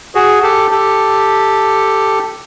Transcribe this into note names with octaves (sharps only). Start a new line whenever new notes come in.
F#4 G#4
G4 A4
G4 A4